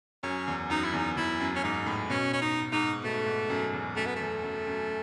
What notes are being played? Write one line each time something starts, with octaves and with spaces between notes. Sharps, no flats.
F#2 C#4
E2
F#2 D#4
E4
E2 D#4
E2 E4
F#2
C#4
G#2 D#4
A2
B2 C#4
C#4
D#4
G#2 D#4
B2 A3
G#2
F#2
E2
F#2 A3
B3
E2 A3
F#2
F#2